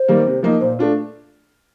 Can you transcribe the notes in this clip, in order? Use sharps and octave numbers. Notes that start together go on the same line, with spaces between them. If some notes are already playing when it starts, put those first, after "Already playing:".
Already playing: C5
D#3 G3 A#3
C3
F3 A#3 D#4
A#2 C5
A3 D4 F4